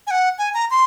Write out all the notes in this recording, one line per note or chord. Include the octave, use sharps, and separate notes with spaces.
G#5
F#5
G#5
A#5
C6